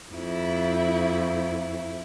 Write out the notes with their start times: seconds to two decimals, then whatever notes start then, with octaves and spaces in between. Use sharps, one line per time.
0.11 F2 E4